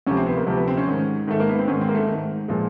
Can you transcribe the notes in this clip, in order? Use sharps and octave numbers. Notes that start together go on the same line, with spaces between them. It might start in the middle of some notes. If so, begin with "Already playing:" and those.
D2 C3 F3 C#4
C4
B3
A#3
D2 C3 F3
B3
C4
C#4
G#2 D#3
G#2 D#3 A3
A#3
B3
C4
G#2 D#3 C#4
C4
A#3
A3
G#2 D#3
A#2 F3 G#3